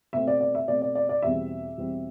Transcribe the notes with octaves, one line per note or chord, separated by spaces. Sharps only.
B2 A3 C4 E5
D5
D5
E5
B2 A3 C4 D5
D5
D5
D5
E2 B2 G3 C4 E5
E2 B2 G3 C4